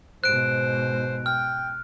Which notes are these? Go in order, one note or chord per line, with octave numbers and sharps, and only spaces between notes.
G#2 B2 C5 F#6 D7
G5 F6